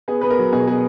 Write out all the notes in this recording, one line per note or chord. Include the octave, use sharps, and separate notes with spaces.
B3 G#4
B3 B4
A#4
F#3
B2 G#4
B3 G#4